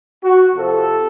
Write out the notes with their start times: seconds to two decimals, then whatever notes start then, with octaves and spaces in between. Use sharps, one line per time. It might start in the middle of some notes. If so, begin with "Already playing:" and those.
0.24 F#4
0.55 C3 F3 A4